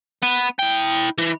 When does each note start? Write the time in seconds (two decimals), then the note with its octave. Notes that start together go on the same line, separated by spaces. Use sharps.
0.22 B3
0.59 E4 G5
1.18 E3